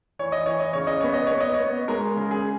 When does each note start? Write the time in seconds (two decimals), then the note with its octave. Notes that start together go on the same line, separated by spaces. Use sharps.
0.19 E3 C#5
0.32 D#5
0.46 E3 C#5
0.60 D#5
0.73 C#3 C#5
0.87 D#5
1.01 B3 C#5
1.13 D#5
1.27 B3 C#5
1.40 D#5
1.53 C#5
1.60 B3
1.88 G#3 A#4
2.16 C#3
2.31 G#4